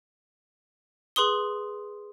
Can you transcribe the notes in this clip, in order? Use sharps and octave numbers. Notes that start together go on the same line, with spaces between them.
G#4 B4 C6 D#6 G7